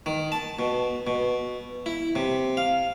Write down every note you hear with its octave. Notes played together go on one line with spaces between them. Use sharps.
D#3
A5
B2
B2
E4
C3
F5